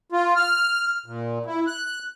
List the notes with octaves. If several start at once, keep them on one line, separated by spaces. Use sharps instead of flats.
F4
F6
A#2
E4
F#6